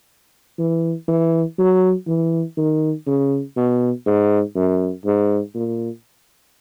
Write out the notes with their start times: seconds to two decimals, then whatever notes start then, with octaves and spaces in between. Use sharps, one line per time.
0.59 E3
1.08 E3
1.58 F#3
2.07 E3
2.57 D#3
3.07 C#3
3.56 B2
4.06 G#2
4.55 F#2
5.05 G#2
5.55 A#2